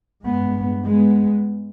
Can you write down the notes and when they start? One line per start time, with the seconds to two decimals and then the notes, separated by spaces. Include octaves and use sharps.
0.24 G2 G#3 B3
0.85 G#3 B3